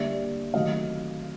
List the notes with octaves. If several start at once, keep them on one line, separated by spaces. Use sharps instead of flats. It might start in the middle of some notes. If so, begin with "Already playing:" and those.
Already playing: D3 G3 A#3 D5 E5
C3 D#3 F#3 A3 D#5 F5